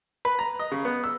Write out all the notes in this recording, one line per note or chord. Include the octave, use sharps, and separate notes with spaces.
B4
A#5
D#5
C#3
B3
E6